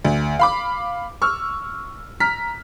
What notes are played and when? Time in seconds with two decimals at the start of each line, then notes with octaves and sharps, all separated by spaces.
0.05 D2
0.39 F5 B5 D6
1.22 C#6 E6 F6
2.20 A#5 F6 B6